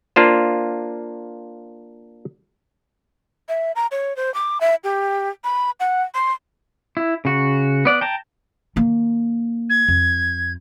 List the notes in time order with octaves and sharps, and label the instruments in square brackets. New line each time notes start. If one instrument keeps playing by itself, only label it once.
[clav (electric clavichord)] A#3 D4 F4 C5
[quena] E5
A#5
C#5
C5
D6
E5
G4
B5
F#5
C6
[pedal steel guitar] E4
C#3 F#4
B3 D5 F#5
G5 A5 A#5
[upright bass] D#3 A#3
[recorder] G#6
[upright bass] F2